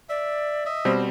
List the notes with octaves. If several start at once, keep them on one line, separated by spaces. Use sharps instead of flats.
D5 E5
D#5 E5
B2 G3 C4 C5